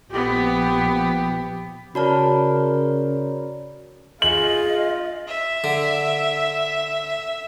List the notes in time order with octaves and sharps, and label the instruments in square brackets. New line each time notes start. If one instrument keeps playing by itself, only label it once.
[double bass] A#1 F3 [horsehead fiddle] B3 G4
[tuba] C#3 [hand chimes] F#4 C#5 D5 [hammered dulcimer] A#4 A5 B5
[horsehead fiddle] F4 [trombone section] G#4 [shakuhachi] D#5 [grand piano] F#7
[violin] E5
[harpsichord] D3